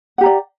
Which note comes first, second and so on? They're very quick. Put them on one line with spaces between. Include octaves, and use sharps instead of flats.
F#5 G4 A#5 D5